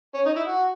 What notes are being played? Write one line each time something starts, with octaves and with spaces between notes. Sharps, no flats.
C#4
D#4
E4
F#4